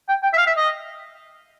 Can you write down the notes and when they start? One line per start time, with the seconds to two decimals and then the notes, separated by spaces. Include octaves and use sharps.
0.09 G5
0.23 G5
0.33 E5
0.38 F5
0.47 E5
0.57 D#5